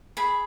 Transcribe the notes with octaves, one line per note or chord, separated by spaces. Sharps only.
G#4 B5